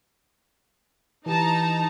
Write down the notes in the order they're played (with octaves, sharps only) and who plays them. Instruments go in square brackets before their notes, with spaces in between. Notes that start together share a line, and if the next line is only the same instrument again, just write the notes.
[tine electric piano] E3 G4 [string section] D#4 A5 A#5